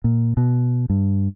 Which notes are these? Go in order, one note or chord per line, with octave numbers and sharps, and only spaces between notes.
A#2
B2
G2